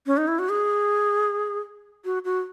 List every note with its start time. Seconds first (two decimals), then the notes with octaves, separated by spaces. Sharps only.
0.06 C#4
0.17 D#4
0.28 E4
0.39 F#4
0.49 G#4
2.05 F#4
2.25 F#4